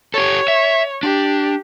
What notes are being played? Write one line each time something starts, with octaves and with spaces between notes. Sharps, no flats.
G4 A4 C#5
E5
D4 G4